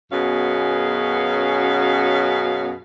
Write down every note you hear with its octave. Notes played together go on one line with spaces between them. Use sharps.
F#2 B2 B3 C#4 G#4 F5